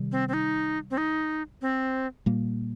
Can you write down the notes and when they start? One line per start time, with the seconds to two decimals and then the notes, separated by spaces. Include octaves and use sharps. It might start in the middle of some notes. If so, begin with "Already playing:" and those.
Already playing: C3 D#3 G3
0.12 C4
0.28 C4
0.33 D#4
0.91 C4
0.98 D#4
1.62 C4
2.26 A#2 G3 A#3